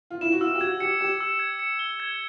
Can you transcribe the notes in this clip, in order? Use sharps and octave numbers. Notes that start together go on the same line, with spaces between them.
F4
E4 E7
F#4
F4 E6
G4
F#4 G#6
G4 C#7
G4 E7
E6
G#6
C#7
G7
G#6